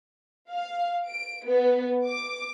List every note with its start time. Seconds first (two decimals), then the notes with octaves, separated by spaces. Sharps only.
0.50 F5
1.06 D7
1.46 B3
2.07 D6